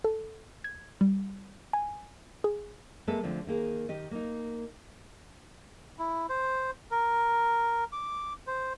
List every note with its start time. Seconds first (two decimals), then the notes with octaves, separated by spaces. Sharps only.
0.04 A4
0.64 G#6
1.01 G3
1.73 G#5
2.44 G#4
3.07 G#3 A#3 C4 A4 B4 E5
3.23 D3 F3 A3 C4
3.47 D#3 A#3 G#4
3.89 D#3 G4 D#5
4.11 A#3 D#4
5.99 E4
6.29 C5
6.91 A#4
7.93 D6
8.47 C5